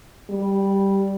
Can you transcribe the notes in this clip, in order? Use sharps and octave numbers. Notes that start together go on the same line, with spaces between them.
G3